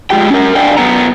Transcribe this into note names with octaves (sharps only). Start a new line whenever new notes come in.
G#3 F4 G4 G5
C#4 A#4
D4 D5 F5 G5 G#5
F#2 B3 F#5 A#5